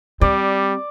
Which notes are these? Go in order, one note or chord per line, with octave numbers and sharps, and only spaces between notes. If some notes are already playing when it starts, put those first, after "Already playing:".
G3 C4 D5